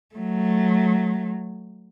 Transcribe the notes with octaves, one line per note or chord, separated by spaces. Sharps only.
F#3 A3